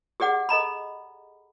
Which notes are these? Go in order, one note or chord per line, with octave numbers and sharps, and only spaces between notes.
G4 G#4 D5 F#5
A4 D#5 A#5 B5